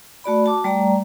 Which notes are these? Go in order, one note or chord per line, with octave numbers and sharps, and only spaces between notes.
A3 F#4 D5 B5
F#4 A5 D6
G3 A3 D5 A#5